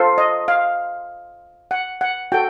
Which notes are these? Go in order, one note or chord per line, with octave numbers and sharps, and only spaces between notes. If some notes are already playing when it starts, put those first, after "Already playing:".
Already playing: F4 A4 C5
D#5
F5
F#5
F#5
F#4 A4 G5